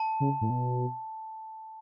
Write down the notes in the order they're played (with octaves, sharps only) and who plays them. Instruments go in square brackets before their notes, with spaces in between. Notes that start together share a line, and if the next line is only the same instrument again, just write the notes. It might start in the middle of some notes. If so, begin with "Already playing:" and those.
Already playing: [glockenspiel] A5
[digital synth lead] C#3
A2
B2